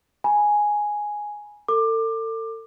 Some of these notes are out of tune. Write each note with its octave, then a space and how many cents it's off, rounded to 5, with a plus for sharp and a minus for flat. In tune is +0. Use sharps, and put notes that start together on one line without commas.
G#5 +0 B5 -40
A4 +35 D6 +20